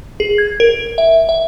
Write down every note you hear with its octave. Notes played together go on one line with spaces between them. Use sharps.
G#4
G#6
A#4
E5
E5